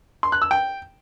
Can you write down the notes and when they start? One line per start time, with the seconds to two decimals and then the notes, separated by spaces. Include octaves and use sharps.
0.23 C6
0.32 F#6
0.42 E6
0.51 G5